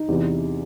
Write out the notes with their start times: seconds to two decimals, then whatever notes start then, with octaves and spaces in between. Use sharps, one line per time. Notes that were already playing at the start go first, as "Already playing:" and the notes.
Already playing: D#4
0.08 E2 C3 E3